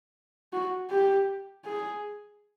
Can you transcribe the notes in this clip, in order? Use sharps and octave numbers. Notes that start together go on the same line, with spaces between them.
F#4
G4
G#4